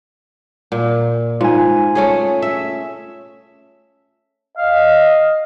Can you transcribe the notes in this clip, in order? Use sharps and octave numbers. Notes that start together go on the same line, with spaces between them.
A#2
G#2 F4 G#5
A3 C#4 G#4
E5
D#5 F5